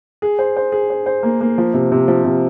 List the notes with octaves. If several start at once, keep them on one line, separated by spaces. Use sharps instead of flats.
G#4
C5
C5
G#4
C5
C5
A#3
A#3
F3
C3
C3
F3
C3